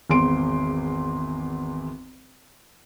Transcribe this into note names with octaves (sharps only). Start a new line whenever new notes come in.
G#1 E2 C6 D7